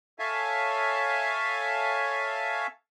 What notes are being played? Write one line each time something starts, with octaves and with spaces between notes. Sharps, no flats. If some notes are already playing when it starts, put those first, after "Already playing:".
A4 C#5 E5 F5 G#5 A5